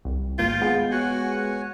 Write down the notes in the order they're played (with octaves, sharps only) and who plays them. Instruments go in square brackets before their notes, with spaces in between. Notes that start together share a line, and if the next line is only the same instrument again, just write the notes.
[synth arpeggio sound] C2
[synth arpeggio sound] G#1 A#3 G6 [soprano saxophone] F4 [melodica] G5
[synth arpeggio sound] G#3 B3
[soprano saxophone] F#4 [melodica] C#5 F#5 G#5